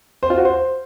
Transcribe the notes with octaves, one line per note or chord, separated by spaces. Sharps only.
C5
F4
F#4
C5